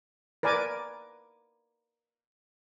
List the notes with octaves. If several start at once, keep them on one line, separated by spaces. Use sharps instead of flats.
A#4 B4 D5 G#5 D6